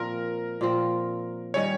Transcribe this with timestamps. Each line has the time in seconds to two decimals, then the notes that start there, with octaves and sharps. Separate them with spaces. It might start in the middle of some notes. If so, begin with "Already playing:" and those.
Already playing: A#2 F3 C4 A#4
0.61 A#2 F3 C4
1.54 D#3 G3 C#4 C#5